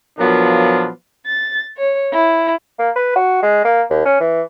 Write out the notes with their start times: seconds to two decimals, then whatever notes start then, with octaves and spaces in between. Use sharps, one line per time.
0.18 A#2 F3 F#3 B3 D4 F4
1.26 A6
1.77 C#5
2.13 E4
2.79 A#3
2.96 B4
3.16 F#4
3.43 G#3
3.65 A#3
3.90 D#2
4.05 C#4
4.20 E3